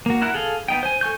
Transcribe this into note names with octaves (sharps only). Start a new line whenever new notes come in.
A#3 F#4
E4 A#4 F#5
G#4 A4 F5
B3 D#4 G5
C5 G#5
A4 G#5 C#6 G6